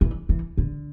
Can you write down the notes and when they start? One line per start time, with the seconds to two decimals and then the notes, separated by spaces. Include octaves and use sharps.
0.01 E3
0.29 E3
0.58 D3